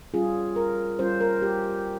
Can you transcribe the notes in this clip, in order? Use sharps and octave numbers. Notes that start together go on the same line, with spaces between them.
G3 C#4 F4 G#4
A#4
G3 C#4 F4 C5
A#4
G4